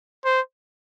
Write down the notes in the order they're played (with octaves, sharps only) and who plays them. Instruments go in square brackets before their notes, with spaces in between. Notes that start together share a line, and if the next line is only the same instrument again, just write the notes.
[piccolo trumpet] C5